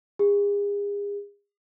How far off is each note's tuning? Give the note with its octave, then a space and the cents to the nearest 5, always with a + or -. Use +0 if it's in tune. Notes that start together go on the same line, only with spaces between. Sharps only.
G#4 -40